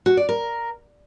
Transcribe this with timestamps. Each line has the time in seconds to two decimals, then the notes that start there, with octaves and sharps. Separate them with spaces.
0.06 F#4
0.17 D5
0.29 A#4